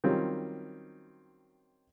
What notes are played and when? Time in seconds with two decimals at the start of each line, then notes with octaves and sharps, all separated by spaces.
0.04 D#3 F#3 G3 C4 C#4 F4